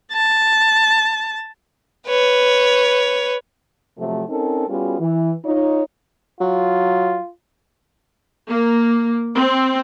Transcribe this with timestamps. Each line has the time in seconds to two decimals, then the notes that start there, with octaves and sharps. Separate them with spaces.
0.12 A5
2.07 B4 C#5
3.98 C3 F3 F#3 A3
4.29 C4 C#4 D#4 A4 A#4
4.68 G3 B3 C#4 F4 F#4 G#4
5.00 E3
5.45 D#4 F4 C#5
6.40 F#3 F4
8.48 A#3
9.34 C4